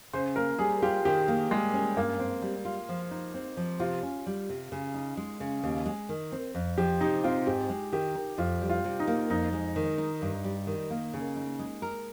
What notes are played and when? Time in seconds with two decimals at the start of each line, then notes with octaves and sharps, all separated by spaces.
0.13 C#3 C5
0.36 A#3 A#4
0.59 G3 G#4
0.82 F4 G4
1.05 D#3 G4
1.28 A#3
1.51 G3 G#3
1.74 C#4
1.96 G2 A#3
2.20 C4
2.42 G3
2.65 F4
2.89 F3
3.11 D#4
3.34 C4
3.57 F3
3.79 C3 F4
4.03 C#4
4.26 G3
4.49 C3
4.72 C#3
4.94 D#4
5.17 G#3
5.40 C#3
5.63 D#2
5.86 G#3
6.09 D#3
6.32 C4
6.54 F2
6.78 F3 G4
7.01 C3 D#4
7.24 C4 F4
7.47 G#2 G4
7.69 G#3
7.92 D#3 G4
8.15 D#4
8.38 F2 F4
8.62 G3
8.69 F4
8.84 C3
9.00 D#4
9.07 A#3
9.30 F2 D#4
9.53 G#3
9.76 D#3
9.98 D#4
10.22 G2
10.44 G3
10.67 D#3
10.90 A#3
11.13 C#3
11.36 D#4
11.59 G#3
11.82 A#4